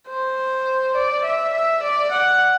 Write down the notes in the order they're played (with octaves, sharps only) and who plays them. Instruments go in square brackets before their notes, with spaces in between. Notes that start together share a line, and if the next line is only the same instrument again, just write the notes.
[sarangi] C5
D5
E5
E5
D5
F#5